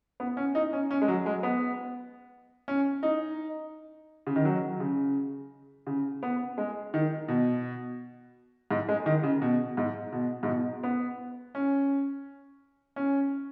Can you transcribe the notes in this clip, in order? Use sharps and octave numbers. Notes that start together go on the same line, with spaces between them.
B3
C#4
D#4
C#4
C#4
G#3
F#3
G#3
B3
C#4
D#4
C#3
D#3
F#3
C#3
C#3
B3
G#3
D#3
B2
G#2
G#3
D#3
C#3
B2
G#2
B2
G#2
B2
B3
C#4
C#4